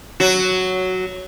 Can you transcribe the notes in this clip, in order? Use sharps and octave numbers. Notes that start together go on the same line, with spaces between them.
F#3 F#4